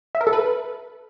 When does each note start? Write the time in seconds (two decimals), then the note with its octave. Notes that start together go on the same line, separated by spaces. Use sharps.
0.15 E5
0.21 A#4
0.27 A4
0.33 B4